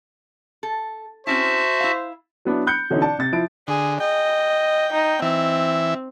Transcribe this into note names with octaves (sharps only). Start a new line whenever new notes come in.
A4
C4 C#4 E4 F#4 C5 E5 A5
E4 F5
F#3 B3 D4 E4
B5 F#6 G6 C#7
B2 D3 E3 C#4 D#4
D5 A5
C3 A6
F3 E4 D7
D3 G#4
D#5 G5
D#4
E3 C4 E5